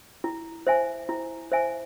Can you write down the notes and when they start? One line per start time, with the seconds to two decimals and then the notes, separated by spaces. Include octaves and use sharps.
0.24 E4
0.67 C5 E5 G#5
1.09 E4
1.52 C5 E5 G#5